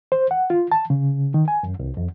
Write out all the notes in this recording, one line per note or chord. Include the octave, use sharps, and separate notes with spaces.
C5
F#5
F4
A5
C#3
D#3
G#5
F#2
C2
F2